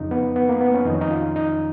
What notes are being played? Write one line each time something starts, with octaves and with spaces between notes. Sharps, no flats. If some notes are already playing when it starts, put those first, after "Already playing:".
Already playing: F2 C#3 D#4
B3
B3
A#3
B3
C#4
F2 D#3 D#4
C#4
D#4
F4
D#4